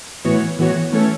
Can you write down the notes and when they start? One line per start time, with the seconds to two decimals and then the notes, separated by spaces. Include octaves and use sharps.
0.25 A2 E3 B3 F#4 C#5
0.58 A2 E3 B3 F#4 C#5
0.92 E3 A3 C#4 A4 C#5